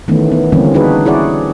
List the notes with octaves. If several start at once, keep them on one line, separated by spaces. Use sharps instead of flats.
D#3 E3 A3 B3 C#4
B3
D3 E3 G3 A#3 C4 C#4
D4 D#4 F#4 G#4 B4
E4 G#4 C#5 D5 F#5